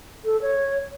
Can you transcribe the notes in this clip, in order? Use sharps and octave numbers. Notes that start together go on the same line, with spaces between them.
A4
C#5